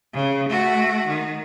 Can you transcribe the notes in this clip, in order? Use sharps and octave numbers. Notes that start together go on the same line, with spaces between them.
C#3
A3 F#4
D#3